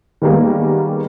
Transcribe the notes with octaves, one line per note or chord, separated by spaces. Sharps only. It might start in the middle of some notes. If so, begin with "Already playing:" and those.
D#3 G3 G#3 A#3 B3